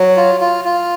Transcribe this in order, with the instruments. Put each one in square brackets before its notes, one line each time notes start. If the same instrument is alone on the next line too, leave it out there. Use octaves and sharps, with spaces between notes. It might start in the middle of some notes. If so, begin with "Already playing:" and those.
Already playing: [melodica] F#3
F4
F4
F4